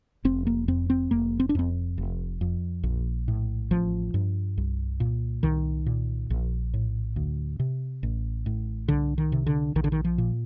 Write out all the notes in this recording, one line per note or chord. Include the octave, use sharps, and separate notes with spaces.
F1 C4
A#3
F2 C4
C4
F1 A#3
C4
D4
F2 C4
F1
F2
A#1
A2
A1 F3
G2
C2
A#2
C2 D#3
A#2
A#1
A2
D2
C3
A1
A2
C2 D3
D#3
C3
D3
A#1 D#3
D3
D#3
F3
A#2